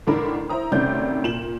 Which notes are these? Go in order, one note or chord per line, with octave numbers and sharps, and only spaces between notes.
A1 D3 D#3 D4 A#4 B5
E4 C5 A#5 D#6
D2 C3 D#3 C#4 D5 G6
A#2 E7 F#7